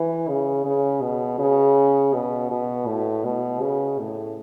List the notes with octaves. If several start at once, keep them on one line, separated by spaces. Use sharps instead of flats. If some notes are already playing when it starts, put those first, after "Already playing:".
Already playing: E3
C#3
C#3
B2
C#3
B2
B2
A2
B2
C#3
A2